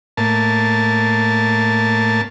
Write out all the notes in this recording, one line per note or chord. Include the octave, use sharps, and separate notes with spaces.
A2 A#3 A5